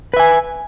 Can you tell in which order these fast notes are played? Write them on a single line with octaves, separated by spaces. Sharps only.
B4 E5 G#5